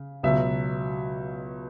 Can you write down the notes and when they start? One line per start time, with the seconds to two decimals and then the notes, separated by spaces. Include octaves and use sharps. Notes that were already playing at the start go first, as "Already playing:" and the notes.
Already playing: C#3
0.23 C#2 B2 F#3 E5